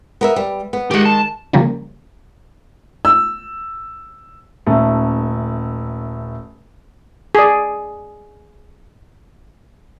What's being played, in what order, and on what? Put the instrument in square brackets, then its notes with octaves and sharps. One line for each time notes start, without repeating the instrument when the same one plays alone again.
[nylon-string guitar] B3 A#4 E5
G3
B3
[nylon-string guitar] D#3 G#3 [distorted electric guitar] G4 F#5
[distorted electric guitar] A5
[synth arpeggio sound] C#3 F3 G3 A#3 C#4
[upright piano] E6
D#1 A3
[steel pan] G#4 D5